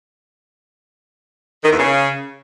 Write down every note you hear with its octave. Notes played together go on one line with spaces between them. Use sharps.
D#3
E2
C#3